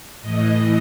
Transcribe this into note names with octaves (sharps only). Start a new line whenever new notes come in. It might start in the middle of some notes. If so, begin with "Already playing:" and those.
A2 E3 D#5